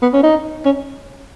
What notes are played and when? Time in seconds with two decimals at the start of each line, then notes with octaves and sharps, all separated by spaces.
0.02 B3
0.13 C#4
0.23 D#4
0.65 C#4